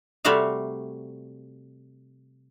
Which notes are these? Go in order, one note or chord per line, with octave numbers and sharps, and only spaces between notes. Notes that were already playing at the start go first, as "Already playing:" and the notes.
C3 G3 A3 F#4 E5 F5